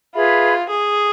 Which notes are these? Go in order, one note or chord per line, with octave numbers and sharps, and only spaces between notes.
F4 G#4 B4 E5 B5
G#4